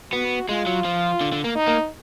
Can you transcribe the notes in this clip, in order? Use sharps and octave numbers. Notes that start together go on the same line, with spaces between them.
B3 F#4
G#3 F4
F#3
F3
D3
D3
A#3
D#4
A#3